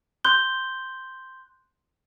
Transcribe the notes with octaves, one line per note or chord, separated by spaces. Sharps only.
C6 F#6 G6 G7